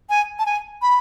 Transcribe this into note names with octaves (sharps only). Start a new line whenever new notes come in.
G#5
A5
G#5
B5